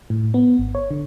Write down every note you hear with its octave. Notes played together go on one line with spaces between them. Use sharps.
A2
B3
G#1
C#5
D3